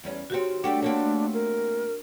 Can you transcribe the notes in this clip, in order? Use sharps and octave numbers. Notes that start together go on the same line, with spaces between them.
E2 G3 C#4
D#3 C4 F#4 G4 C#5
G3 A3 D4 F#4 G5
A3 A#3 C4 D4 C#5 F#5
A#4